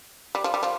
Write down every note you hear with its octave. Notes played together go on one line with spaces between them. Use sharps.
G3
F3
G3
F3